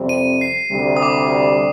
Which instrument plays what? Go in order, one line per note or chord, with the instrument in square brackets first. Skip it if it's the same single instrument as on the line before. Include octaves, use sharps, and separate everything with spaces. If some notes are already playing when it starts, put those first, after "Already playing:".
Already playing: [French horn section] F2 C3 G3 C4
[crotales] D#7
C7
[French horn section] D2 C3 G3
[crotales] D#6
D6